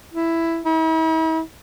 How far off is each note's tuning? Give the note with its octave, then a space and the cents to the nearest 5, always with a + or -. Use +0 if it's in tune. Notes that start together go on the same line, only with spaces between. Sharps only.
E4 +5
E4 -45